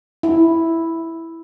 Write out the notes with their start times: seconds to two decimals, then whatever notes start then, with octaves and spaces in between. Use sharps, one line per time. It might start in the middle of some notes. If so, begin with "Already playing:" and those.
0.23 E4